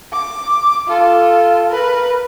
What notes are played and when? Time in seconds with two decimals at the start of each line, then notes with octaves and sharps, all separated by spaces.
0.12 D6
0.88 F4 A4
1.69 A#4 B4